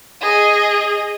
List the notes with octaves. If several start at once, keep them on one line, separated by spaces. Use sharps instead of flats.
G#4 D#5